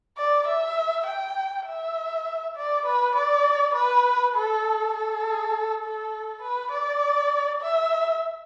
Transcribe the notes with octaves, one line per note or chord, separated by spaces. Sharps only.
D5
E5
G5
E5
D5
B4
D5
B4
A4
A4
A4
B4
D5
E5